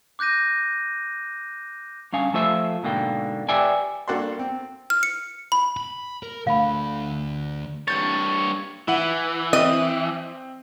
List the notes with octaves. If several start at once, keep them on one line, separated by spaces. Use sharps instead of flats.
D6 F#6 G6 A#6 D#7
G2 C#4 F5 G#5
F3 A3 F4 C5 E5
G#2 B2 D3 A#3 G5
G4 B4 D5 E5 G5 G#5
G2 A#3 F#4 A4 D5 C6
C4
F6
C#7
B5
B5
A#4
D2 A3 F5 B5
G2 C#5 G6 A6
E3 E4 F#5
C4 D#5